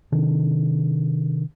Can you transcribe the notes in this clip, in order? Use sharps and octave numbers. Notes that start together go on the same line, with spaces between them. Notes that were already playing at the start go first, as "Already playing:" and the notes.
C3 D#3 D4